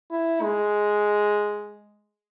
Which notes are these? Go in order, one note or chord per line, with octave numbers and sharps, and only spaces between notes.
E4
G#3